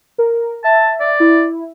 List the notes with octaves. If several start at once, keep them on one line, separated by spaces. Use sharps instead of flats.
A#4
E5 A5
D5
E4